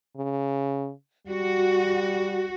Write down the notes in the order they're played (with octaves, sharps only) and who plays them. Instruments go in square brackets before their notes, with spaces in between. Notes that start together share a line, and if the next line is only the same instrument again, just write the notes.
[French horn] C#3
[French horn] G3 [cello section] F#4